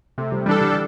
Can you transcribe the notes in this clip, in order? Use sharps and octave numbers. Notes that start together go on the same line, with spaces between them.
C3 A3
G3
E3 G3 D4 A4
D3